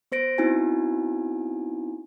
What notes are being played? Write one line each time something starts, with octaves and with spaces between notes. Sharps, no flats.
B3 C5 A#6 D7
B3 C4 D#4 E4 F#4 G#5